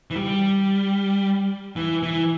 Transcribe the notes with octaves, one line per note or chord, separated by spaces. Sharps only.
E3
G3
E3
E3